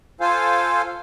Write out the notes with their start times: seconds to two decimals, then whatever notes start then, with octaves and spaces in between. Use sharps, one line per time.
0.21 F4 A4 C5 F5 G#5